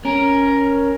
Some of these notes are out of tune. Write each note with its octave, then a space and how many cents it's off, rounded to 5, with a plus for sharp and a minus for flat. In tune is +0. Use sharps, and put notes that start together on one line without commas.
C#4 +0 A#4 +10